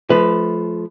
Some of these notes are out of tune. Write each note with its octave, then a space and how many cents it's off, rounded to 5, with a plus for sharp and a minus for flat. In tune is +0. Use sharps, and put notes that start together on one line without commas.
F3 +0 A3 -30 B4 +10